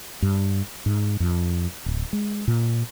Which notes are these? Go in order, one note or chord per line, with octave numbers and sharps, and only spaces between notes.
G2
G#2
F2
D1
G#3
A#2